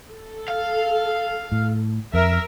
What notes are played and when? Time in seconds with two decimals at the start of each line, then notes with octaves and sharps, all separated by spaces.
0.12 A4
0.48 F5
1.52 A2
2.14 F2 A#4 E5